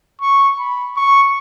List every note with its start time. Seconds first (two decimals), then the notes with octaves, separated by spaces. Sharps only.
0.22 C#6
0.59 B5
0.96 C#6